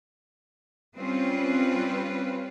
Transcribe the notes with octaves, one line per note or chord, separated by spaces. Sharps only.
G3 C4 C#4 F4 B4